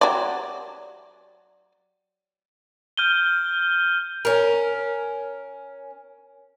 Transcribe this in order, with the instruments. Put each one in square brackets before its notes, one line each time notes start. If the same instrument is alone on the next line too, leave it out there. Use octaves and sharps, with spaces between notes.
[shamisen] F#3 G4 D5
[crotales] F6 G6 D#7 G7
[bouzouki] C#4 A#4